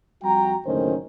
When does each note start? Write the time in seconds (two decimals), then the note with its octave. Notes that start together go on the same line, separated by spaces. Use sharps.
0.23 F2 G3 F#4 G5 A#5
0.65 F#1 D2 A2 D#3 C#4 C5